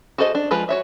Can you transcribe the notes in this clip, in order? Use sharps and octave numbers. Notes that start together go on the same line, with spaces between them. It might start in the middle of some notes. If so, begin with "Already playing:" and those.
F#4 G#4 A4 C5 D#5
D4
F3 G#3 F4 B4
F#4 C#5 E5